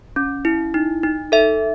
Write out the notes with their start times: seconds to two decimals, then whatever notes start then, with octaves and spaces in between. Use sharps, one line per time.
0.16 C#4
0.45 E4
0.74 D#4
1.03 D#4
1.32 A4 E5